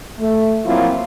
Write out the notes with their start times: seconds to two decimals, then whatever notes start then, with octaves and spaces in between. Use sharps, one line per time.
0.19 A3
0.65 F3 F#3 A#3 C4 E4 F4